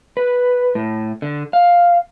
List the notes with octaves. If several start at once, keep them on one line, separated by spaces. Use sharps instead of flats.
B4
A2
D3
F5